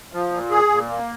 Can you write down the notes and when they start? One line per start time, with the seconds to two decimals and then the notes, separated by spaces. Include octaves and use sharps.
0.13 F3
0.32 A#2
0.51 G#4
0.70 A#2
0.89 A#3